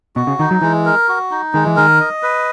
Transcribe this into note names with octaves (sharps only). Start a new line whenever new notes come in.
B2 F#4
C#3
D#3 D#4
F#3
E3 G#3
A#4
F#4
D#4
D#3 G#3
E3
D#3 A#4
D#5
B4